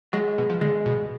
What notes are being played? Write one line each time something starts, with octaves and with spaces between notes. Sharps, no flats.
F#3 G#3
B2
F3
D3 G#3
B2